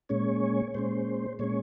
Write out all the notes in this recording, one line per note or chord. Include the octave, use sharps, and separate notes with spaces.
A#2 G#3 C#4 C#5
A#2 G#3 C#4 C5
A#2 G#3 C#4 C#5